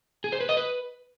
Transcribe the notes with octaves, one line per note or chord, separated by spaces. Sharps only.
G#4
C5
B4
D#5
B4